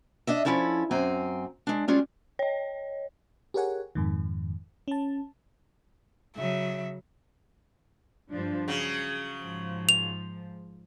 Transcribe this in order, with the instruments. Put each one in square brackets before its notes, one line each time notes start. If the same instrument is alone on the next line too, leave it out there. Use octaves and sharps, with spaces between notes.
[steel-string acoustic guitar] D4 D#5 E5
F3 C#4 E4 A4 C#5
F#2 C4 G#5 A#5
G#3 D4
G3 G#3 C#4 D4 F4 C#5
[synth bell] C#5 D#5
[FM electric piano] G4 G#4 A#4 C#5 F#5 G#5
F2 G#2 D#3
C#4 A5
[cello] C#3 F#3 [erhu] E5
[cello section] G2 F3 D4
[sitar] C#3 F#3 [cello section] G#4
[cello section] G#2 F3
[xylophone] F7